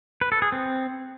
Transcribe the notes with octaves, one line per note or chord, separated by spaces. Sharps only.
B4
A4
G#4
C4